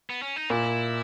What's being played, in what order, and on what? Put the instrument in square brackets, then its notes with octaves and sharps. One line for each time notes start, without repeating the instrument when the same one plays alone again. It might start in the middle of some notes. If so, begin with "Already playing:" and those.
[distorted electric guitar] B3
C#4
D#4
[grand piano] A#2 [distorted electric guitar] E4